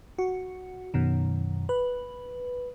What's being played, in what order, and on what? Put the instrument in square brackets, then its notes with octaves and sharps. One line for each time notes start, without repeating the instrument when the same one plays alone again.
[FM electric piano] F#4
F#2 B2 D#3
B4